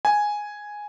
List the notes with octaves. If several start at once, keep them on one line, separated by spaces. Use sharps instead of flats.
G#5